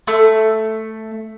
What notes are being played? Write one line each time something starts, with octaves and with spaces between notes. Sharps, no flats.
A3